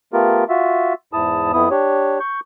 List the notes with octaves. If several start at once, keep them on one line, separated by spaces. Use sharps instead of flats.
A3 B3 F4 G4 A#4
F4 F#4 E5
E2 G#2 E4 A5 D#6
F2 B3 E4 D#6
D4 G4 C#5
C#6 G6